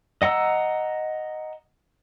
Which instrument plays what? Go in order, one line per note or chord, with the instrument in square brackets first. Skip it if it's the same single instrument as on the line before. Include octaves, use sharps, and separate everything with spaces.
[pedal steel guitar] D#5 F#5 A#5 E6